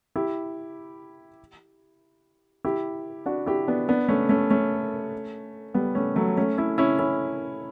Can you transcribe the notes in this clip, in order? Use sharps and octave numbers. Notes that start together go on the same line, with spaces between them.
E4 G4
E4 G4
D4 F#4
E4 G4
B3 D4
B3 D4
A3 C#4
A3 C#4
A3 C#4
G3 B3
A3 C#4
F#3 A3
A3 C#4
C#4 E4
C#4 E4
C#4 E4